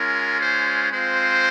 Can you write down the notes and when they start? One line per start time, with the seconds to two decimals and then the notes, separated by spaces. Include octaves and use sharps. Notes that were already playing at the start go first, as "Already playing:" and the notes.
Already playing: G#3 C#4 F4 A#4
0.40 C5
0.90 G#3 C4 F4 C5